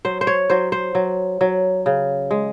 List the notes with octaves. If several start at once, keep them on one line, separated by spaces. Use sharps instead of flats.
F#3 C5
C5
C#5
F#3 C5
C5
F#3
F#3
C#3
G#3